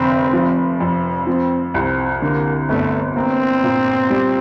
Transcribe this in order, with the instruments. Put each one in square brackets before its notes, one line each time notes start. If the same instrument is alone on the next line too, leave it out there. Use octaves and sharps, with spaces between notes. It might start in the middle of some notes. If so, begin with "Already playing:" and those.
Already playing: [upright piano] F1 D3 [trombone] C4
[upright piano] F3
F2
[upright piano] F3 [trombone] C4
[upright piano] C2 [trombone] C4
[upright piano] D3 [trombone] A#3
[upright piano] G1 [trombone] A3
[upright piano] A#3 [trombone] C4
[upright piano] A#2
G3